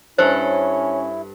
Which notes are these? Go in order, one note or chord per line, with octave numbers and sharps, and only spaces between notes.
G2 C#4 E4 A4 C5